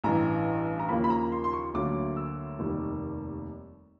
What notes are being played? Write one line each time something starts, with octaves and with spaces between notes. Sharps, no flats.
A1 G2 E3 A#5
A#5
D#2 C#3 F3 A#3 B5
B5
A#5
C6
C6
C#6
D2 D3 F#3 A#3 D6
E6
F1 D#2 D#3 G3